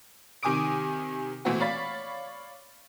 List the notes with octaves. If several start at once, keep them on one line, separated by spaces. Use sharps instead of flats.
C3 D#3 G#5 D6 D#6 D7
A#2 E3 A3 B3 C4 F#4
C#5 D5 F5 B5 A6 B6